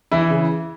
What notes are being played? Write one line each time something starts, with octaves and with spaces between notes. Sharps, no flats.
E3 E4
C#3